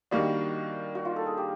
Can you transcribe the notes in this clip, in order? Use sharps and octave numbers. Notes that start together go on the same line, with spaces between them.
D#3 G3 A#3 D4 F#4
F#4
F4
A4
G#4
G4